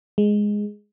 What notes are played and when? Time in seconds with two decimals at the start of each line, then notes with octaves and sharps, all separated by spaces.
0.18 G#3